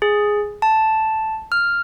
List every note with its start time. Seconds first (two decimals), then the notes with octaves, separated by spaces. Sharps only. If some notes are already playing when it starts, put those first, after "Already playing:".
0.02 G#4
0.62 A5
1.52 F6